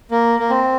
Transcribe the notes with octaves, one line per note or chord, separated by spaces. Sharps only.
A#3
A#3
C4